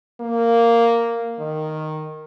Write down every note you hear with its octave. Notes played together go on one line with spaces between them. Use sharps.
A#3
D#3